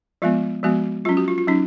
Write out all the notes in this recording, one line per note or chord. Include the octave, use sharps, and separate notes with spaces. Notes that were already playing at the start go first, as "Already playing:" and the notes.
F3 G#3 B3 F4
F3 G#3 B3 F#4
F#3 C#4 F4
F#4
F4
F4
F#3 C#4 D#4